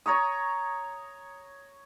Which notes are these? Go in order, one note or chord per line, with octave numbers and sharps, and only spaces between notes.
C#5 A#5 C#6 D#6